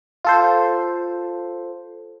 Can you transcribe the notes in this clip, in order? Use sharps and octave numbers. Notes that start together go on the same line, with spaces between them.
F4 A4 C5